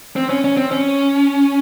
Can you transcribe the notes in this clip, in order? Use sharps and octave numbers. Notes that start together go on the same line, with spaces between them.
C4
C#4
C#4
C4
C#4